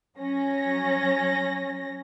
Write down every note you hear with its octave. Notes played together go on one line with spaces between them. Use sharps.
F#3 C#4 A#6